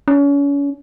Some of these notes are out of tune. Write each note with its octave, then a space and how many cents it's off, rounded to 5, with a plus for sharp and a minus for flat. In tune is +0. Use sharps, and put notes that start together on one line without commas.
C#4 +35